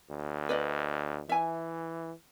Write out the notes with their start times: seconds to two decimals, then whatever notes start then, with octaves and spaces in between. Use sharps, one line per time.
0.10 D2
0.49 B4 D5 D#5
1.29 E3 E5 G#5